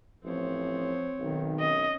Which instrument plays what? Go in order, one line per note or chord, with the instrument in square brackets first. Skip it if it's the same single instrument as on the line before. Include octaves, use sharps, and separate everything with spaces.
[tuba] A1 [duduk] F3 [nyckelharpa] C4 C#5
[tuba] B1 [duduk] D#3
[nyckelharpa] C#4 [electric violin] D#5